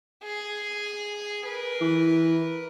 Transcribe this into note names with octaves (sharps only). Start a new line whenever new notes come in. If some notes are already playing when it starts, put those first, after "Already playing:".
G#4
A#4 B4
E3